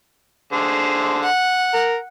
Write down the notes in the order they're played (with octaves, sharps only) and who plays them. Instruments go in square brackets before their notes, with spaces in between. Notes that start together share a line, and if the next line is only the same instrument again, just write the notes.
[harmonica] D3 G#4 C5
[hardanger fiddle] F#5
[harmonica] A#4